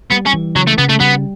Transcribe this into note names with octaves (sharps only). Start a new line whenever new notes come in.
G3 B3
C#4
E3
C#3 F#3
A3
C#3 B3
A3
G3 B3